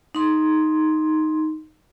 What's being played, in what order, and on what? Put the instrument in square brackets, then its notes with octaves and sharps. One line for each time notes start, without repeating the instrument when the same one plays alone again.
[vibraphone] D#4 C6